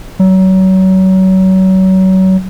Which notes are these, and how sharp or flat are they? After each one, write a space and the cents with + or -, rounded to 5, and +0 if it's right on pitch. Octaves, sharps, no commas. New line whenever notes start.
F#3 +30